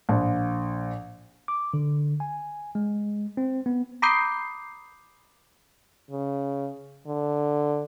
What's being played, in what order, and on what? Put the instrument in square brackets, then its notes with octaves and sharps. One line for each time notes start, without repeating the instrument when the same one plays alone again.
[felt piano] A#1
[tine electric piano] D6
D3
G#5
G#3
C4
B3
[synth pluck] A#5 B5 D6 D#6 G6 C7
[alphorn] C#3
D3